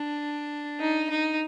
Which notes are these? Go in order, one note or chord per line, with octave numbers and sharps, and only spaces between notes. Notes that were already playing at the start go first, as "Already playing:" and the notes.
Already playing: D4
D#4
D#4